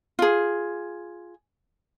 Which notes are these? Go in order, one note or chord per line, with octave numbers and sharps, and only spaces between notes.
F4 G#4